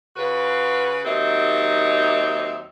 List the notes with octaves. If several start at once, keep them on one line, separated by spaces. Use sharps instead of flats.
C#3 F4 F#4 B4
D#2 F#3 C4 D#4 E5